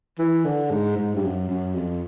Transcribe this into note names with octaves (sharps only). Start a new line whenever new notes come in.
E3
D3
G#2
G#2
G2
F#2
F#2
F2